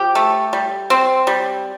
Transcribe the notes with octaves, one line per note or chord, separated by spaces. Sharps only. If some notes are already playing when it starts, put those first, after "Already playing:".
Already playing: F3 G4
A3
G3
C4
G3